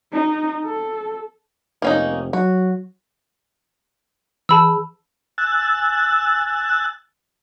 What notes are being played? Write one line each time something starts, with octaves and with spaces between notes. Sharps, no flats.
D#4
A4
F1 A#3 C#4 D#4
F#3 F#4
E3 G#4 A5 B5 E6
G#5 E6 F#6 A6